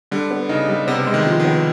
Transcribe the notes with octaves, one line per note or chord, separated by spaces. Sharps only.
D3 G3
B3
C#3 D#4
G3
C3 B3
G#3
D#3
F3
D#3
B3